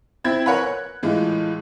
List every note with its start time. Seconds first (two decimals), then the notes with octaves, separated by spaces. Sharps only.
0.24 C4 E4 G#6
0.46 A#4 B4 C#5 F#5 G#5 B5
0.63 F#6
1.03 A2 E3 G#3 F4